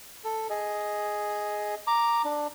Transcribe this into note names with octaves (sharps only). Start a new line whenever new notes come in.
A4
G#4 D#5
A#5 D6
D4